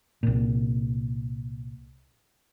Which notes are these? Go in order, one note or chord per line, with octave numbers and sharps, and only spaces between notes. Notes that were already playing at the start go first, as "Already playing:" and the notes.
C2 A#2